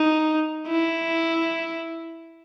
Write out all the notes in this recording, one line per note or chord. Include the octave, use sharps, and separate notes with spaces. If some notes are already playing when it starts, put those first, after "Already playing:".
Already playing: D#4
E4